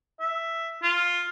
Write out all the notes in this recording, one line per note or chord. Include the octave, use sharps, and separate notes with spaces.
E5
F4